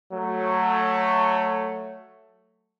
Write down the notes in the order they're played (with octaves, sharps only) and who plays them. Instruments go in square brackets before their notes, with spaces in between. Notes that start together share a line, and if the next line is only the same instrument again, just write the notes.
[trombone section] F#3 A3